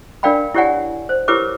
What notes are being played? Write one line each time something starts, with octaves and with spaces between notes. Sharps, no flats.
D4 A#4 D5 F5 G5 B5
E4 G4 C#5 D5 F#5 G#5
C5
E4 G4 A#4 B4 C#5 D6